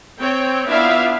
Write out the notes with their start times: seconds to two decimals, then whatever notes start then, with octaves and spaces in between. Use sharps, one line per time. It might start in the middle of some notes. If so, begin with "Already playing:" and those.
0.19 C4 C#5 G5
0.67 B3 D4 E4 F4 E5 F5